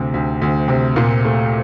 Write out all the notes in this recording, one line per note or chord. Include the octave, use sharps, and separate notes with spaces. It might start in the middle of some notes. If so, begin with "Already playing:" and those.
Already playing: D2 C3
D2
D2
C3
A#2
A3